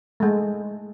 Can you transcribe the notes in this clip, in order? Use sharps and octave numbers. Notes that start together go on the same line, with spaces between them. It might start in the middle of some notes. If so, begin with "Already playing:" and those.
G#3 A3